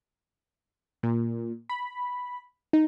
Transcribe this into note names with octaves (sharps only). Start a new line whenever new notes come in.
A#2
B5
D#4